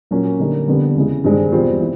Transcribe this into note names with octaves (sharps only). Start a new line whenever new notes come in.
A#2 F#3 A#3 C#4 F#4
D3 G3 A#3 D#4
F2 D3 G3 B3
E2 C#3 E3 G#3
G2 D#3 G#3 C4
E2 B2 G3 C4 F4
E3